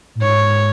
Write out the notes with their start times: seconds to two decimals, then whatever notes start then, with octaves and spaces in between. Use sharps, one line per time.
0.15 A2
0.21 G#2 C#5